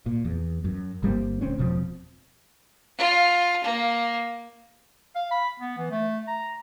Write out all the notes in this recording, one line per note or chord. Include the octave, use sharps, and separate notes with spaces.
A#2
E2
F#2
G1 G3 A#3 C4
D#1 D2 C4 C#4
E1 B2 F3 C4
F4
A#3
F5
B5
B3
E3
A3
A#5